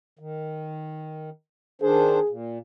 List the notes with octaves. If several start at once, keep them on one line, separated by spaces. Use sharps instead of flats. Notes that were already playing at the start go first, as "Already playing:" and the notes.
D#3
D#3 D4 G#4 C5
A#2